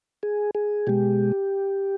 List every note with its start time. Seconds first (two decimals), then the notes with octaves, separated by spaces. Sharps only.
0.23 G#4
0.55 G#4
0.87 B2 G#3 G4